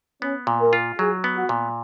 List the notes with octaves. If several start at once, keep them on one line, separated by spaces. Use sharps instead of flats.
B3 C#4
A#2
A#4
F4
F#3 G#4
B3
F#4
A#2